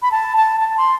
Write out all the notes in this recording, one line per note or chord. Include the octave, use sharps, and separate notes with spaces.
B5
A5
A5
A5
C6